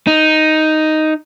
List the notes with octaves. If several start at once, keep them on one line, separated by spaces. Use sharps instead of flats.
D#4